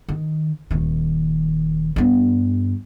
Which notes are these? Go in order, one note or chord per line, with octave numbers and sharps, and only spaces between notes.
D#3
D#1 D#3
G2 B3